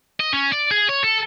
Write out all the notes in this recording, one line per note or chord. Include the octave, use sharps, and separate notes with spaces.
D#5
C#4
D5
G#4
C#5
A4